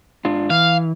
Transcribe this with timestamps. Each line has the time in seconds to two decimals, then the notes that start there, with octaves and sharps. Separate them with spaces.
0.25 G#2 D4 F4
0.50 E3 F5